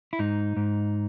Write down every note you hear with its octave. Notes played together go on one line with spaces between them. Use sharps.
E4
G#2 D#4
G#2